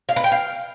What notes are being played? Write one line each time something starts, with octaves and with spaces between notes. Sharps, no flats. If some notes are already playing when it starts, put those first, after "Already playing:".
F5
B4
G5
F5